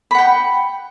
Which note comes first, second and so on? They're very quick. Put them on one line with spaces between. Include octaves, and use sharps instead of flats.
B5 F#5 G5